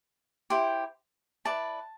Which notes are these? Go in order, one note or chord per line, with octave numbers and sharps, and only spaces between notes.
E4 G4 C5
E4 B4 D5 A5